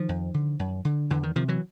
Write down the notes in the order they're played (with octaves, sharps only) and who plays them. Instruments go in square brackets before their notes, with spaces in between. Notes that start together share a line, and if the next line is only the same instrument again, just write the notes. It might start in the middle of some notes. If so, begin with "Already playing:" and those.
Already playing: [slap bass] D#3 F3
F2
D3
F#2
D3
E2 D3 E3
D#3
C3 D#3 F3
E3 F#3